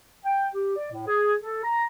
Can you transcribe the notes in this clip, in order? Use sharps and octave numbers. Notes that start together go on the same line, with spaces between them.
G5
G4
D5
A2
G#4
A4
A#5